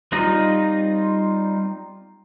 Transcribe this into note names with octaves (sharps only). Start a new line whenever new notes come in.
G3 C4 D#4 F4 D#5